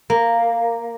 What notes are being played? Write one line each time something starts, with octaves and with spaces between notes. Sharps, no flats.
A#3